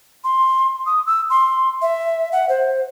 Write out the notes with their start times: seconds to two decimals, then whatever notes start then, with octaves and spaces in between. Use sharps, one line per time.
0.24 C6
0.86 D#6
1.06 E6
1.30 C6
1.82 E5
2.32 F#5
2.49 C5